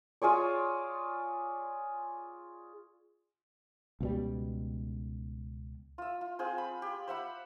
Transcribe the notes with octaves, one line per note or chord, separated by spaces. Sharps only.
F4 G#4 C#5 D5
C#2 B2 G3
F4 E5
F4
C4 F4 G#4 C5
B5
G4
C5 E5 F#5 B5